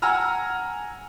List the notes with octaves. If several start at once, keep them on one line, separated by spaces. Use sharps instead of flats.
F#5 G#5 A#5 E6 F6